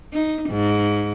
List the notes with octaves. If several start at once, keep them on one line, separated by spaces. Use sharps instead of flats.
D#4
G#2